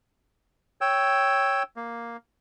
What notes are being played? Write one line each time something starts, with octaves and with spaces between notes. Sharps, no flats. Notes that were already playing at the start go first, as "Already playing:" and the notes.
C#5 G5 E6
A#3